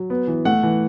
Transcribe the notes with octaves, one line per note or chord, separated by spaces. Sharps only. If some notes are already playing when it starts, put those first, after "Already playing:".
Already playing: F#3
B3
E3
A3 F#5
E3